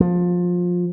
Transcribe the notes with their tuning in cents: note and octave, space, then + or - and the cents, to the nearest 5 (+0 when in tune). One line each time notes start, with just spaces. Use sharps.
F3 +20